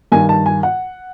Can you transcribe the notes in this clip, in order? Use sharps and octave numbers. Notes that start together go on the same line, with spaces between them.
G2 D#3 G#5
A5
G#5
F#5